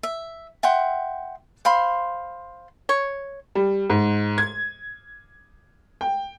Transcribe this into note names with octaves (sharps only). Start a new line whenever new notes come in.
E5
E5 F#5 G5 C6
C5 F5 B5 C6
C#5
G3
G#2
G#6
G5